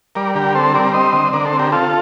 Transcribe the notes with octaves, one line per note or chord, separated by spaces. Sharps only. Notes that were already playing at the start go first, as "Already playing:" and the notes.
G3 A#4 D5
D3 G4 A#4
C4 A4 C5
G3 A#4 D5
C4 C5 D#5
D3
D3 A#4 D5
A4 C5
C4
G4 A#4
C4 F4 A4